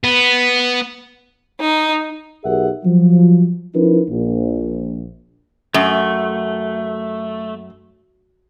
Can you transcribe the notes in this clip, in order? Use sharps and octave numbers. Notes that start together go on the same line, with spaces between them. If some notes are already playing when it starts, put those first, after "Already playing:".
B3
D#4
B1 G4 G#4 A#4 E5 F#5
F3 F#3
F3 C#4 D#4 E4 A#4 B4
A#1
F#2 A3